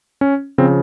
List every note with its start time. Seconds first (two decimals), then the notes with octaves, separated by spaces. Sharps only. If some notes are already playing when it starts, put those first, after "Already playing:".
0.21 C#4
0.58 C#3 F3 C4